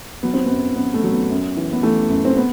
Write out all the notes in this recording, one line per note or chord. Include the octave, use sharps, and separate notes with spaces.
F#3 B3
C4
F#2 B3
F#2 B3
A3
F#3
B3
F#2
E3
B3
E3 A3
F#2
C4
B3